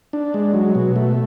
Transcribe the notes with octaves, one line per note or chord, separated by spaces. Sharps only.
D4
G#3
F#3
B2
A3